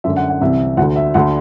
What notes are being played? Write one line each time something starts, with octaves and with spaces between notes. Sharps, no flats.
F#2 D3 E5
F#5
F#5
C2 C3 E3 E5
D2 F#5
D3
E5
D2 D3 F#5